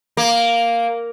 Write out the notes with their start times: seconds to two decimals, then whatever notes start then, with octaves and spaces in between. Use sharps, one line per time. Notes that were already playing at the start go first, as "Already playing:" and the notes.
0.17 A#3